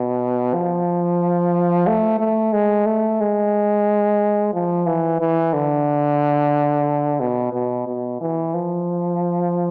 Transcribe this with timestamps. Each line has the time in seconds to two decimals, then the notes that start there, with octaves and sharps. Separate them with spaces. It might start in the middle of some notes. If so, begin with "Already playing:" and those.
Already playing: B2
0.54 F3
1.87 A3
2.20 A3
2.53 G#3
2.86 A3
3.21 G#3
4.54 F3
4.86 E3
5.20 E3
5.54 D3
7.20 B2
7.53 B2
7.87 B2
8.21 E3
8.54 F3